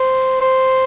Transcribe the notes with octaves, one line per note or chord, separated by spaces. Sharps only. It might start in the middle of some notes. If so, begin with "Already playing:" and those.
Already playing: C5
C5